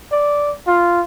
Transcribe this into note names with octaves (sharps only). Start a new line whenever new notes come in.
D5
F4